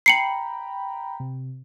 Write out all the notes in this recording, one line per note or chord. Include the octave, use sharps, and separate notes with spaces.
G5 A#5 B5 C7 C#7 F#7
C3